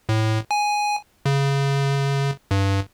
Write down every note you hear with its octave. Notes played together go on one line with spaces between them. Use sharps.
A2
G#5
C#3
G2